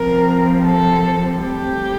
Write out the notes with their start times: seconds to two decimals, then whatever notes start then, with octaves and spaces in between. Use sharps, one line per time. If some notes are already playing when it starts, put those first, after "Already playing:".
Already playing: C3 F3 C4 A#4
0.64 A4
1.42 A2 G3 C4 G4